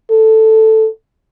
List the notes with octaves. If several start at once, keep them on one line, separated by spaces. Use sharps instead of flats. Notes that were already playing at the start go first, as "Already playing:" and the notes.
A4